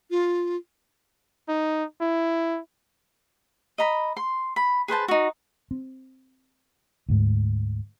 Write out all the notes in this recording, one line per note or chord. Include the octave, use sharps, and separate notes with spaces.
F4
D#4
E4
D#5 A#5 B5
C6
B5
G#4 B4 C5 A5
D#4 F#4
C4
D2 G#2